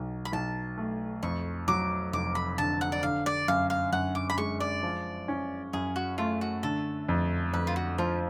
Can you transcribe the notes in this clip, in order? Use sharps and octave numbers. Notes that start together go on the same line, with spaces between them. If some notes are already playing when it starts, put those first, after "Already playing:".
Already playing: B1 B2
B5
B1 A5
A3
F2 C#6
F#3 D6
F1 D6
B5
D3 A5
F#5
D5
D3 F5
D5
F#2 F5
F5
F#2 F#5
D6
B5
G#3 C#6
D5
F3
C#4
F#2 G#4
F#4
A3 F4
F#4
D3 A4
F2
F2 B4
F4
F#4
F3 F4